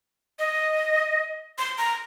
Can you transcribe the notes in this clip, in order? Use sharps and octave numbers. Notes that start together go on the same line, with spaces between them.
D#5
C6
A#5